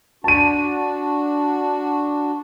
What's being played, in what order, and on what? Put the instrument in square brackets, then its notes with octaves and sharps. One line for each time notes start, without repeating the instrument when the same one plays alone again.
[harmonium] D4 F#4 [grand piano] A5 D#7